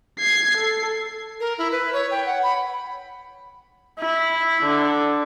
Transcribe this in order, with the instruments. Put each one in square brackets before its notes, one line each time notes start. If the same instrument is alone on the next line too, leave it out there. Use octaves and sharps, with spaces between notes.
[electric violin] G#6 C7
A4
[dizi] A#4
E4
B4
C#5
G5
F#5
B5
[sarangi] E4
D3